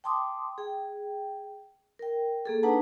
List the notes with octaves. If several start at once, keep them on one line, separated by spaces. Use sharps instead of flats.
G5 A5 C6 D6 D#6
G#4 G5
A#4 G5
A#3 G#4 A4
D4 D#4 B4 F#5 A5 A#5